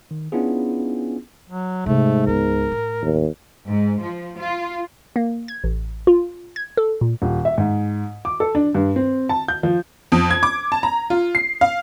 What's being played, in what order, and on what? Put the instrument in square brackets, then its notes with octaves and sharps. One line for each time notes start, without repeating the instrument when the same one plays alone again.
[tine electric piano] D#3
B3 C#4 D4 E4 F4 G#4
[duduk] F#3
[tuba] G#2 [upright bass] C3 C4 [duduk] A3
[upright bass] C#2 B3 [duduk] A#4
[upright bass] A2
[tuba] D#2
[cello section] G#2
F3
F4
[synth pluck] A#3
G#6
A1
F4
G#6
A4
A#2
[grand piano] D#1
E5
G#2
D6
A4
D4
G2
C4
A5
G6
F3
[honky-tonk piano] F2
G#6
D6
A5
A#5
F4
C7
F5